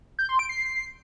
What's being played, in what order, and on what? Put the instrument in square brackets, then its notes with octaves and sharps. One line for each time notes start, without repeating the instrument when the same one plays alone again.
[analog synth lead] G6
C6
D7
C7